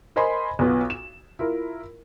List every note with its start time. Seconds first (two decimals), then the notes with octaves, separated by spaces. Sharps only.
0.16 A#4 C5 D#5 G#5 B5 C6
0.59 B1 B3 F4
0.90 E7
1.39 E4 F4 A#4